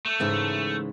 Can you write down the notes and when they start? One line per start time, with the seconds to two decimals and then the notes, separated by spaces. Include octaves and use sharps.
0.06 A3
0.20 G#2 C#3 E3